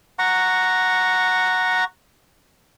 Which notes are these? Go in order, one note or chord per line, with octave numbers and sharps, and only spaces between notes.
F#5 A#5 C#6